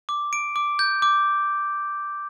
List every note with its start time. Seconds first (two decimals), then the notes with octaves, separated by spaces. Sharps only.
0.09 D6
0.33 D7
0.56 D6
0.79 G6
1.02 D6